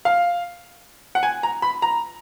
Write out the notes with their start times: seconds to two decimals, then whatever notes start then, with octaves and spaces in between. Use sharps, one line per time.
0.05 F5
1.15 F#5
1.23 G#5
1.43 A#5
1.62 B5
1.82 A#5